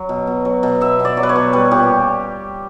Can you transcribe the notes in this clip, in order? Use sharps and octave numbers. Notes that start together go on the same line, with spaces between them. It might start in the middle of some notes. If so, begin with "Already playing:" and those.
Already playing: F#3
B2
B2
F#3
B2
B3 E5
B2
D5
F#3
B4
C#5
B2
G3 B4
A#2 G4